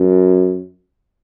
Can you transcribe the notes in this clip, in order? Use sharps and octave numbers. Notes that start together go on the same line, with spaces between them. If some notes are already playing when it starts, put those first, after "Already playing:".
Already playing: F#2